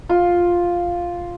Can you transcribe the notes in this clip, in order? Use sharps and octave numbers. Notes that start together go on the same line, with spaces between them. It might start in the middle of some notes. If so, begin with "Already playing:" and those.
F4